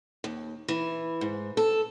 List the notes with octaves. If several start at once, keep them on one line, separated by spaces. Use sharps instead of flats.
D#2
E3
G#2
A4